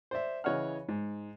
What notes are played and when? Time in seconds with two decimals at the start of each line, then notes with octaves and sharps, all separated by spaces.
0.11 C5 D5 E5
0.44 C#3 E3 C#5 D#5 F#5 F6
0.89 G#2